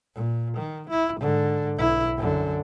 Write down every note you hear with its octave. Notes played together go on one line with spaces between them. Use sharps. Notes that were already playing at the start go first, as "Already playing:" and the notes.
A#2
D#3
E4
G#2 D3
B1 E4
F#2 D3